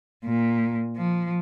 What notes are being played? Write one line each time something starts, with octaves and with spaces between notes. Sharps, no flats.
A#2
F3